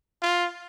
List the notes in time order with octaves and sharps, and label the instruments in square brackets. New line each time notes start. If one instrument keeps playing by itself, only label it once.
[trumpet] F4